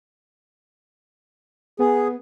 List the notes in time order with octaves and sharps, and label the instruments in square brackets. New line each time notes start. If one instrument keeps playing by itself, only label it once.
[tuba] B3 [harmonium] G#4